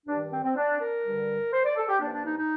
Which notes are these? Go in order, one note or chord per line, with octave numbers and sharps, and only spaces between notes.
G2 D#3 G3 D4
C4
C4
D4
A#4
G2 D3 G3
C5
D5
A4
G4
G2 F3 A#3 D4
D4
D#4
D#4